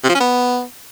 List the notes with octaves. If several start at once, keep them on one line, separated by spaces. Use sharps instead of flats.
C3
F3
C#4
B3